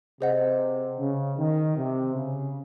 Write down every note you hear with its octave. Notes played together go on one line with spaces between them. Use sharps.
C3 G#4 C5 D#5 F#5
C#3
D#3
C3
C#3